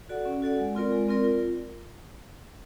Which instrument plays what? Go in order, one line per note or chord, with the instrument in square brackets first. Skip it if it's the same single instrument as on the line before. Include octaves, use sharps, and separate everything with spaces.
[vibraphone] F#4 A4 D5 F#5
C#4
F#4 A4 D5 F#5
G#3
C4 F4 A#4 D5
G#3
C4 F4 A#4 D5
F4